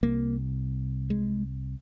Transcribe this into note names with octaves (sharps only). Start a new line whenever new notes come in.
C2 C3 A#3
G#3